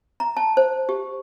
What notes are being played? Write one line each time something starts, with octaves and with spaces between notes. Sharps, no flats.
A#5
A5
C5
G4